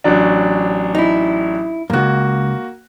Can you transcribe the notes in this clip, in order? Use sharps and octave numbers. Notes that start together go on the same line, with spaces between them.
A1 F#3 D4
D#4 E4
C#2 F#2 A#3 F#4